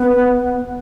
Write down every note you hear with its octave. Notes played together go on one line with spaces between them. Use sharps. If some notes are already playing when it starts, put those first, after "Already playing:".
Already playing: B3